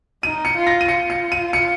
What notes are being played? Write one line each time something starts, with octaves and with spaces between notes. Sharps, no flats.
D#4 D#7
C#7
F4
A#6
D#7
F4 C#7
C#7
D#7
C#7